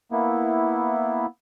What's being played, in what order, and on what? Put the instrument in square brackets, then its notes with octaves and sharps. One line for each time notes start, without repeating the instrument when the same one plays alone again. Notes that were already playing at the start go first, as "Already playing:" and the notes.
[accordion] A#3 B3 E4